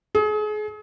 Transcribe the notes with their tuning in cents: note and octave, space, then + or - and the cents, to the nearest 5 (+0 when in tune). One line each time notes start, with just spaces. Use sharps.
G#4 +35